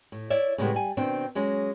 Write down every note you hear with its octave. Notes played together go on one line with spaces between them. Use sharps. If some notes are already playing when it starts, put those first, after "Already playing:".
A2
E4 C#5 D5 E5
A2 C#3 G3 G#3 B3
G3 G#5
B2 D#3 C4 D4
F#3 G#3 C#4